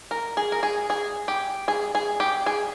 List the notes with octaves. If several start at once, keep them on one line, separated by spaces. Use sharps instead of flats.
A#4
G#4
A#4
G#4
G#4
G4
G#4
G#4
G4
G#4